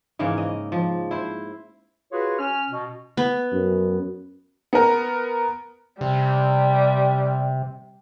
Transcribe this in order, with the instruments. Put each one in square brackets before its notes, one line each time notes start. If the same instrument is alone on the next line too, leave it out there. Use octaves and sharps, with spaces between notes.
[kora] G#2 C#3 E3 A#3
D#5
F3
E4 C5
[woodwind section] F4 F#4 G#4 B4 C#5
C#4 F6
B2
[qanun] B3
[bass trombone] F#2
[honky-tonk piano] B3 A#4
[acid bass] C3 [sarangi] G3